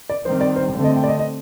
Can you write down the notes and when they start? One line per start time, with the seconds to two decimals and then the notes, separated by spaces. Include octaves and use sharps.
0.10 D5
0.25 D#3 G3 C4 C5
0.41 D5
0.56 C5
0.73 D3 A3 C4
0.84 D#5
0.96 G5
1.04 D5
1.08 D#5
1.19 D#5